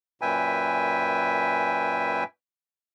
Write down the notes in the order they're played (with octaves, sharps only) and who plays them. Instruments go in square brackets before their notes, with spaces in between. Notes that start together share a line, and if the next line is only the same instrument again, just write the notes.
[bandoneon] F#2 A#2 B4 E5 G5 G#5